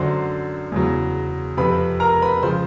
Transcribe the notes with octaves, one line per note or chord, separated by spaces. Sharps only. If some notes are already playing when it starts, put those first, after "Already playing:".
Already playing: F#2 D3 F#3 C5 C6
E2 C#3 F#3
F2 C3 F3 B4 B5
A#4 A#5
B4 B5
C#3 F3 C5 C6